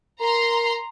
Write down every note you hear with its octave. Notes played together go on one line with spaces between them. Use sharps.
A#4 A#5 C6